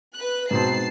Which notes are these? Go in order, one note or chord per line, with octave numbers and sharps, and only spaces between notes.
B4 F#6
G#2 B2 C4 A5 C7